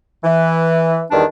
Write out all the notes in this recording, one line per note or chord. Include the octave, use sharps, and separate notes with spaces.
E3
E2 D#3 G3 D4